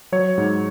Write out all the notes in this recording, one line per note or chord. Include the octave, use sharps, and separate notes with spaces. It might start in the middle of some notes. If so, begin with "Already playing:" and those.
F#3 C#5
G#2